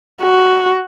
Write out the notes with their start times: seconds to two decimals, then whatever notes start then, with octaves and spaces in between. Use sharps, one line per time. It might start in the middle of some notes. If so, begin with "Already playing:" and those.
0.21 F#4